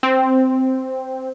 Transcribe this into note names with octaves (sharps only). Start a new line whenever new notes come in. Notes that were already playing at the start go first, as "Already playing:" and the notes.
C4